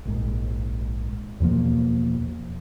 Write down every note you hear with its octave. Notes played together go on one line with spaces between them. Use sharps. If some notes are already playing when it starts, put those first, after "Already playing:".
A#1 G#2
E2 B2 F3 A#3